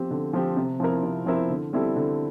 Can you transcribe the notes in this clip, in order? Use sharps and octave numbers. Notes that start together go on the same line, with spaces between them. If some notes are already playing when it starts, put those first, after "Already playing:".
Already playing: F3 C4 G4
D3
F3 C4 G4
C3
F3 C4 E4 A#4
C3
F3 C4 E4 A#4
D3
G3 C4 E4 A4
D3